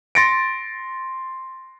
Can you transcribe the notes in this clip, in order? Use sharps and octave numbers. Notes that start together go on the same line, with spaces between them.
C6 A6 A#6 C#7 D7